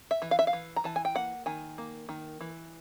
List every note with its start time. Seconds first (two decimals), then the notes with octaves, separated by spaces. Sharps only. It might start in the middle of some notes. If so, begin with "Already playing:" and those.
0.11 E5
0.22 E3
0.31 F5
0.39 E5
0.47 F5
0.53 E3
0.76 A#5
0.84 E3 A5
0.96 G#5
1.05 G5
1.15 A#3 F#5
1.46 D#3 G#5
1.78 A#3
2.09 D#3
2.41 E3